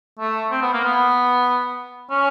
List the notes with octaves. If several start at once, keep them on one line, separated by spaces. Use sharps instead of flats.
A3
C4
B3
A#3
B3
C#4